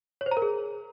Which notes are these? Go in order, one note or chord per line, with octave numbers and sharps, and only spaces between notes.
C#5
C5
A#5
A#4
G#4